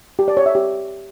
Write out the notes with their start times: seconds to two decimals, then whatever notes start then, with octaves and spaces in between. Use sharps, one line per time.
0.19 G4
0.28 D5
0.37 C#5
0.46 E5
0.55 G4